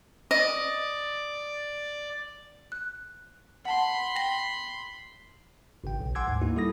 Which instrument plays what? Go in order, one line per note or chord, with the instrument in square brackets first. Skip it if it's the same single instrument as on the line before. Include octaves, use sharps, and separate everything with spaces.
[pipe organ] D5 [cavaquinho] D#5
[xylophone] F#6
[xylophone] F#5 A5 [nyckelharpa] B5 C6
[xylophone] G5 A#6 F#7
[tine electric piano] G#1 C#3 G5
B1
F#5 G#5 C6 D6 E6 G#6
D2 G#2
A#3 D#4 E4 F#4
G3 E4 A4 D#6 A#6